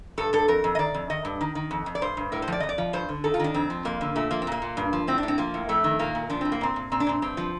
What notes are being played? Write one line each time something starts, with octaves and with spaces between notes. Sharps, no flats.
G2 A4
G2 A4
F2 A#4
F2
D#5
D#3 D5
F2
D#3 D#5
G2
D#3
D#3
F2
F2
D5
G2 C5
G2
A2 A#4
C5
F3 D5
F2 D#5
D5
F3
G2 C5
D3
D#3 A4
F4
D#3 D4
F2 C4
F3
F2 A#3
D3
A#2 A3
F3 A#3
C4
A#2 A#3
A#2
G2
F3
A2 C4
D4
A2
C4
F3 A#3
A2
F2 A3
D#3
A#2 A#3
A#2
F3 D4
A2 C4
A#3
A#2 C4
A#2
A#2 C4
D4
A#2 C4
G2 C4
F3